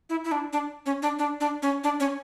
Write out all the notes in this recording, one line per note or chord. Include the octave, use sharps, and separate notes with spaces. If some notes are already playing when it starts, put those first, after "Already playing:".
E4
E4
D4
D4
C#4
D4
D4
D4
C#4
D4
C#4